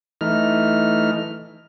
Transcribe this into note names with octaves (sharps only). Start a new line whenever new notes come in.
E3 A3 D#4 F6